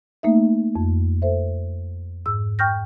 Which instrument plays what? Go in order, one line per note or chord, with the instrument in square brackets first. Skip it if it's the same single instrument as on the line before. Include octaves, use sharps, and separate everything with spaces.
[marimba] A3 A#3 D#4 E5
F2
A4 C5 E5
G#2 E6
G5 C#6 F6 G6 A#6